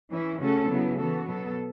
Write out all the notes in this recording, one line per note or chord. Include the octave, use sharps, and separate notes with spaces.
E3 C#4 E4
C#3 A3 C#4 F#4 A4
C#3 F#3 B3 E4
E3 B3 F#4 A4
B2 F#3 B3 A4